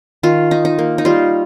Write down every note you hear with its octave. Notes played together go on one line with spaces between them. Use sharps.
D#3 F4
D#4
D#4
A#3
D#4
G3 F4